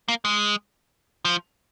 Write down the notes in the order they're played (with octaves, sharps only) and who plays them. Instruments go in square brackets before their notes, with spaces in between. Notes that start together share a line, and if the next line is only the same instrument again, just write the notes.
[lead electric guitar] A#3
G#3
F3